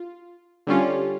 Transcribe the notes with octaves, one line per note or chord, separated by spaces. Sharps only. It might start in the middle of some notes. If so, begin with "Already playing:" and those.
Already playing: F4
D3 G3 C#4 F4